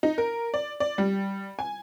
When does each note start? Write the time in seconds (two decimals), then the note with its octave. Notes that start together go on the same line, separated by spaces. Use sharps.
0.03 D#4
0.18 A#4
0.54 D5
0.80 D5
0.98 G3
1.59 G#5